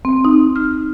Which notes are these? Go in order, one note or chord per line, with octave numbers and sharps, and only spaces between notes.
C4
D#4
F6